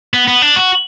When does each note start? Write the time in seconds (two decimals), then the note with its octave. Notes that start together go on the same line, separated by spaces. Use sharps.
0.14 B3
0.28 B3
0.42 D4
0.56 F#4